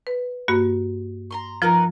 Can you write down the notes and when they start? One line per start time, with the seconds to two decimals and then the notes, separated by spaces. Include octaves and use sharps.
0.07 B4
0.48 G2 A#3 F#4
1.31 A#5 C6 C#6
1.62 F3 D#4 F4 A#4 B4